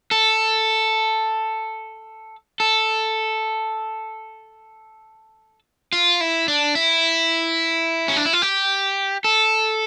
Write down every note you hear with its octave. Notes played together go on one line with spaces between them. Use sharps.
A4
A4
F4
E4
D4
E4
C#4
D4
E4
F4
G4
A4